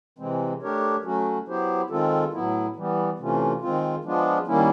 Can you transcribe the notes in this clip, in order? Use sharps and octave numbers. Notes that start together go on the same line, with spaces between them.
C3 E3 G#3 C4
A3 D4 G4 A#4 C#5
F#3 A3 C#4 F#4
F#3 B3 E4 G4 C5
D#3 G#3 C4 F4 A4
A2 F#3 B3 E4
E3 G3 B3
C3 E3 A3 C#4 F4
D#3 G#3 C4 F4
F3 G#3 B3 D4 F4
D#3 G3 A#3 C#4 E4